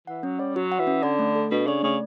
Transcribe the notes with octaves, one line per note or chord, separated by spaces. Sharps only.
E3 F#5
F#3 C#4
G3 C#5
F#3 F#4
F#5
E3
C#4
D3 D5
A3
A4
B2 D4
C#3 D5
C#3 A3